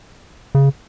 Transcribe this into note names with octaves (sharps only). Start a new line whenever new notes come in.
C#3